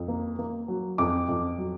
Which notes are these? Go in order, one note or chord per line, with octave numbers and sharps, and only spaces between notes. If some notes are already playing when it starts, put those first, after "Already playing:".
Already playing: F2
A#3
A#3
F#3
F2 D6
F2
F#3